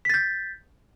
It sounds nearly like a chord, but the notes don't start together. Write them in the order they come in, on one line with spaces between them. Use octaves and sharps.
B6 A6 G6